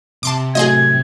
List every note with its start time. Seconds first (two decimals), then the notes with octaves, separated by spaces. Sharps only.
0.23 C3 A5 C6 D6
0.55 A2 F#3 G#4 C5 D#5 G#6